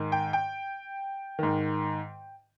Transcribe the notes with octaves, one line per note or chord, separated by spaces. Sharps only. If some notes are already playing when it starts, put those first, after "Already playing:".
Already playing: G#2 D#3
G5
G5
G#2 D#3